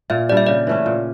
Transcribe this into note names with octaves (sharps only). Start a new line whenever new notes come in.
A#2 E5
G3 D4 G4 D5
E5
C#3 D5
E3 A3 C#4
A#2